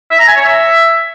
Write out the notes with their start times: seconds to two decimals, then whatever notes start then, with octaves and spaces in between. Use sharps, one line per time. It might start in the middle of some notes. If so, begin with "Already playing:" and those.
0.11 E5
0.20 A#5
0.28 G#5
0.37 C#5
0.45 E5